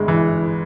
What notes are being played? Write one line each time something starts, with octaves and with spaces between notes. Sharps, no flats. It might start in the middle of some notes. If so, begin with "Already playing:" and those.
Already playing: G1 G2 G#3
E3